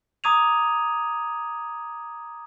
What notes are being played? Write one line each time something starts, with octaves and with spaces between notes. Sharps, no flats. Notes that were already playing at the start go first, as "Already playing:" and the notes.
A#5 D6 D#6 G#6 D#7 F7